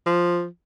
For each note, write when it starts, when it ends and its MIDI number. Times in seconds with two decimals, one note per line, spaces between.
0.06 0.45 53